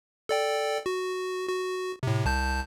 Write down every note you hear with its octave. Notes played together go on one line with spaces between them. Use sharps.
A4 D5 G5
F#4
F#4
A2 C3
C2 A5 G6